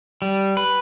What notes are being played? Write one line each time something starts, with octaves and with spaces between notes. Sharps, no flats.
G3
B4